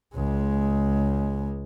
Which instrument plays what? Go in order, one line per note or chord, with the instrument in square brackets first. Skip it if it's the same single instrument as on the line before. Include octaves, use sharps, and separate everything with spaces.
[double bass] C#2 G#3